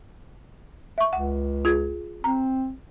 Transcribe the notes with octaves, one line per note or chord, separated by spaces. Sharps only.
E5 C#6
C#2 F#5
F4 G#4 G#6
C4 A#5